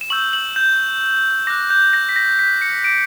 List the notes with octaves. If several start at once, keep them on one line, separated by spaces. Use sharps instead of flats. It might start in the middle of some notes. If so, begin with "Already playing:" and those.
E7
C#6 E6 G6 F#7
F#7
G6
D6 F#6 A#6
G6
A#6
B6
A#6
B6
C#7
D6 F#6 D7